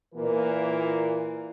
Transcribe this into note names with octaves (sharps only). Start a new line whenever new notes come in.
A#2 E3 A#3 A#4